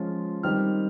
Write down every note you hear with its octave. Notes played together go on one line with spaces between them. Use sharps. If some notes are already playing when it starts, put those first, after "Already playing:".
Already playing: F3 G#3 C#4 F4
D#3 G3 C4 D#4 F6